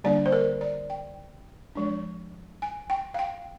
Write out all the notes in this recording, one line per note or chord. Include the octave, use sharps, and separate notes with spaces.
D3 G3 A#3 D4 D5
C5
A#4
D5
G5
F3 G#3 D4
G#5
G5
F5
G5